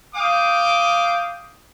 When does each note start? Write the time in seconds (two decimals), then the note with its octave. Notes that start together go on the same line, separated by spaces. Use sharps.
0.15 F5 G5 D6 D#6